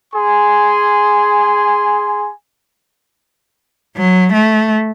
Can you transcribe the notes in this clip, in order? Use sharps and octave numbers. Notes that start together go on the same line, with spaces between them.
G#4 G#5 C6
F#3
A3